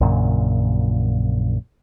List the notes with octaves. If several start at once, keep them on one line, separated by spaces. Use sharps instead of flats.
A#1 F#2 A#2 C#3